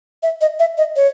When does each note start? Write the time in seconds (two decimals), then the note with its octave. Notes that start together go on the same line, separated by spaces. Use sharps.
0.23 E5
0.41 D#5
0.59 E5
0.78 D#5
0.96 C#5